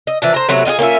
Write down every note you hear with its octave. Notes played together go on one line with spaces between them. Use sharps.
D#5
E3 F3 D4
C5 A#5
C3 F#3 A3 B3
D#4 F4 F#4 G#4
A#3 C#4 F4 E5